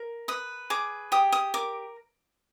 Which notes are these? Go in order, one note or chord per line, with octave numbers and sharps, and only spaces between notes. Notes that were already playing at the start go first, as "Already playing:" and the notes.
Already playing: A#4
B4 D#6
G#4 D6
G4 D#6
D#6
A#4 D6